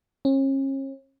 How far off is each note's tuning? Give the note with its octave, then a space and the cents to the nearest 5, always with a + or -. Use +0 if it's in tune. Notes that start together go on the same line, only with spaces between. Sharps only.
C#4 -40